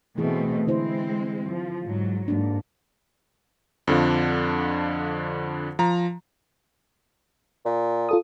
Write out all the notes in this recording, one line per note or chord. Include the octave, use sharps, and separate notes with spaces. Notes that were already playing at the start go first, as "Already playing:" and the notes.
B2 E3 A3 C4 G#4
D3 G#3 C4 E4 C5
F3
G#2 F#3
G#2 A#3 D4
F2 D3 F3
F3 A#5
A#2
F4 A4 D#6